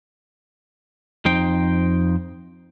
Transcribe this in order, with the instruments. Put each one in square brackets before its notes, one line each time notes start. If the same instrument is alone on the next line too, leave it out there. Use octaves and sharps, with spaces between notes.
[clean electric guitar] F2 D#4 C5 G5